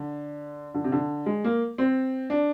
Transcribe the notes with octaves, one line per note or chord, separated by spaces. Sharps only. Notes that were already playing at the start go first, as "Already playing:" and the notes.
Already playing: D3
D3
C3
D3
G#3
A#3
C4
D4